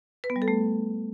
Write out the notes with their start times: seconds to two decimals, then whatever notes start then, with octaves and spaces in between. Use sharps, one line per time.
0.24 B4
0.30 B3
0.36 G3
0.42 A4
0.48 A3